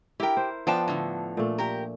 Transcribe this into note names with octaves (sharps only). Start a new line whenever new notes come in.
E4 G4 A#4 G5
C5
F3 B3 D4 F5 G5 A5
A2 D3
A#2 A3
G4 A#4